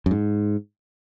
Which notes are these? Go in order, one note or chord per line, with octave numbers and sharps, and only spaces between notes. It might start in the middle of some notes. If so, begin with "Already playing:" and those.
F#2
G#2